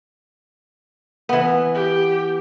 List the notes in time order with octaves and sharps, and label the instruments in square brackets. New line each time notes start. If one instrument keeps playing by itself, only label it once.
[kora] E3 B3
[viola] G4